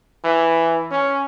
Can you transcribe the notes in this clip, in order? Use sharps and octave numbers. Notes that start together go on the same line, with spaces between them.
E3
C#4